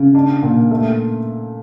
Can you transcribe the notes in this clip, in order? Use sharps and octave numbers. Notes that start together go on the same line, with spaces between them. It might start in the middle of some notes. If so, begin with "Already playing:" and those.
Already playing: C#3
D4
A#2
A3